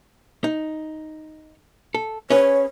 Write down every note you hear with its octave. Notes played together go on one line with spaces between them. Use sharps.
D#4
A4
C#4 G#4 B4 C#5